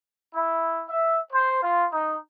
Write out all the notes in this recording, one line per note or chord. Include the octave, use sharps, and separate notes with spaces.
E4
E5
C5
F4
D#4